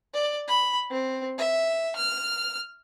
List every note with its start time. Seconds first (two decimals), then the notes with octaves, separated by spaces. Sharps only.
0.14 D5
0.48 B5
0.91 C4
1.38 E5
1.96 F6